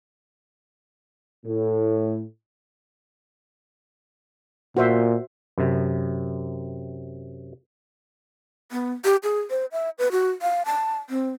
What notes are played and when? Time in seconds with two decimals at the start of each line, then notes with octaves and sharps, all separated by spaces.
1.46 A2
4.77 A#2 F#4 C5 E5
5.58 F#2 C3
8.72 B3
9.05 G4
9.23 G#4
9.50 C5
9.72 E5
9.98 B4
10.12 F#4
10.42 F5
10.66 A5
11.10 C4